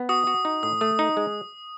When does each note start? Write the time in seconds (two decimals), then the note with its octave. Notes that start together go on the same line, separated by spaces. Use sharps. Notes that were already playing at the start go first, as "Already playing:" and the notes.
Already playing: B3
0.09 F#4 D#6
0.27 F#4
0.45 D#4
0.63 A2 D#6
0.81 A3 D#6
0.99 D#4
1.17 G#3